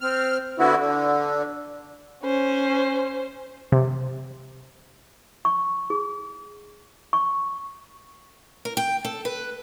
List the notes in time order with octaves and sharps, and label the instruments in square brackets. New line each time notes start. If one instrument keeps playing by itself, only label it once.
[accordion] C4 F6
D3 B3 E4 F#4
D3
[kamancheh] C#4 C5
[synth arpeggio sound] C3
[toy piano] C#6
G#4
C#6
[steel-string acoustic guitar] A#4
G5
A4
B4